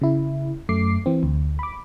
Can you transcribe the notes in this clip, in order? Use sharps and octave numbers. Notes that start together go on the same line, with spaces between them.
C#3 E4
F#2 A3 D6 C7
E3 C4
D2
B5 D6